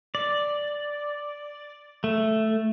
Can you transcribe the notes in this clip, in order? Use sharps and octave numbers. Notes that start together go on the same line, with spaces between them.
D5
A3